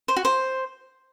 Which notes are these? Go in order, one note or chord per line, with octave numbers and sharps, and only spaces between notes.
C5
F#4
C5